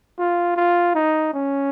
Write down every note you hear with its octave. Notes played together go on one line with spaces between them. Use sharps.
F4
F4
D#4
C#4